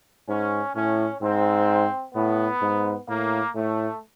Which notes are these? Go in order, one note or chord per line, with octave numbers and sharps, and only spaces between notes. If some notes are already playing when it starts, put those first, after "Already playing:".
G#2 C#4
A2 C#4
G#2 C4
A2 B3
G#2
A2 A#3
A2 A3